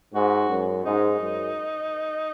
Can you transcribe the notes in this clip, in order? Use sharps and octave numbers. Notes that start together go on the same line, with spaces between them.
G#2 F#4
F#2
G#2 D#4
F#2